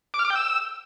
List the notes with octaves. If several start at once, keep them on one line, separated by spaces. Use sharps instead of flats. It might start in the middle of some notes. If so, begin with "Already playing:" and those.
D6
F6
D6
G5
E6